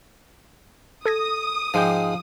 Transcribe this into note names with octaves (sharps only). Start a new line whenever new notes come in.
A4 D#6 G#6 A#6
G#2 F3 G#3 G5